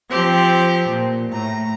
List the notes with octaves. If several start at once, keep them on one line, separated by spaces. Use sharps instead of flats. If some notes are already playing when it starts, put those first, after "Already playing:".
F3 C4 G4 A#6
A#2
A2 A#5